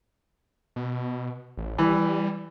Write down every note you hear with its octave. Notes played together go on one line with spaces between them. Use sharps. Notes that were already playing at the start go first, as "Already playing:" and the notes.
B2
A1
E3 G3